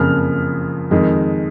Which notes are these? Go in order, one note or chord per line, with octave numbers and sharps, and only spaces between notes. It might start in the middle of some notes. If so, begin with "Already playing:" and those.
Already playing: F#1 F2 C#3 F3 F6
F2 D#3 G#3